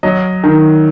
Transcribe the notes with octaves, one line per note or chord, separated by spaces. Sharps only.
F#3 D#5
D#3